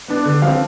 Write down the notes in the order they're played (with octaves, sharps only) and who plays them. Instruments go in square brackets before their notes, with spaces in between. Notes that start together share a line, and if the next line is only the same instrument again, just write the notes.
[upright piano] B3 D4
D3
F3 C4 F5